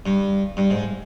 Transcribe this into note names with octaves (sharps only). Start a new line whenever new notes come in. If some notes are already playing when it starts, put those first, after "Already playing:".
G2
G2
G#2